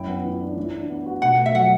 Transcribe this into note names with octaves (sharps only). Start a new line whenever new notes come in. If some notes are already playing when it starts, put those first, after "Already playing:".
Already playing: F#2 E4 G5
B3
E3
D4
E3
D4
B3
F#4
B2 F#5
A3
E5
F#3 F#5